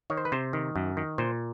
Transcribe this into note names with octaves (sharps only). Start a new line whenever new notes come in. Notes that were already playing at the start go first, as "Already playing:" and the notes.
D#3 C#5
C5
B4
C3 C5
D#3
F#2
D#3
A#2 C5